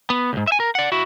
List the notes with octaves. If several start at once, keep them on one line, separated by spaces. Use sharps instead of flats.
B3
C#2 G#2
E5 G#5
A#4
D5 F#5
E4 F#4